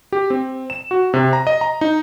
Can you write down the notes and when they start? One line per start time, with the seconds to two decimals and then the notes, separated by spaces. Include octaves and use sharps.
0.12 G4
0.30 C4
0.70 E7
0.91 F#4
1.14 C3
1.33 A#5
1.47 D#5
1.61 A#5
1.81 D#4